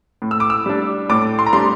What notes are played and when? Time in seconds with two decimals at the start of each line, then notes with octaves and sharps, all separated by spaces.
0.22 A2
0.31 E6
0.40 D6
0.50 E6
0.66 G3 D4
1.09 A2 D6
1.39 C6
1.46 A#5
1.53 G3 D4 C6